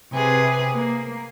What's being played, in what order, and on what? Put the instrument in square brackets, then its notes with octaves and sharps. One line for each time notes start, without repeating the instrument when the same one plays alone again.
[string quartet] C3 G#4 B4
A#3